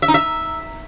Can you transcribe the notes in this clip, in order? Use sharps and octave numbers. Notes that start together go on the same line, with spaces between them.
E5
D#4
E5